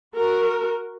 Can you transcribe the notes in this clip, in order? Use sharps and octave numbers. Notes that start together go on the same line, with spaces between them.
F#4 A#4